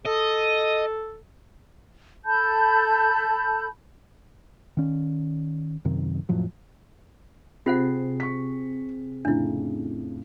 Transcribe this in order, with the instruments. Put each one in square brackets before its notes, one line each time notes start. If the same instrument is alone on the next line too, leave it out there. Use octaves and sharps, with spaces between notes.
[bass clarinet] A4 [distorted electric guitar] D#5
[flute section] A4 A5 B5 G6
[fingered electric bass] D#3 C#4
F#2 C3 D#3 C4
F2 A2 F3 F#3
[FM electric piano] C3 [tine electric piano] C4 G#4 C7 [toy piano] F4 C5 F#5
[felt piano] C#6 B6
[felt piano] F2 A2 C#3 [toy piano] D4 E4